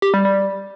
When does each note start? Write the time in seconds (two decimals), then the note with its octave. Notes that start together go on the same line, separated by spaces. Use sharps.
0.02 G4
0.14 G3
0.25 G3